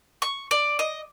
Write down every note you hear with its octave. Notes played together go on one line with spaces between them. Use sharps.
C#6
D5
D#5